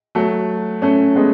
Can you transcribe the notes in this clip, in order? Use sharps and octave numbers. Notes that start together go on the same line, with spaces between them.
F#3 A3
A3 C#4
G#3 B3